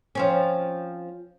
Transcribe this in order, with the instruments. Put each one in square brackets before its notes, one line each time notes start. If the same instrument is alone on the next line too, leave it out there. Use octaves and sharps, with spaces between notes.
[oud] F3 C4 C#4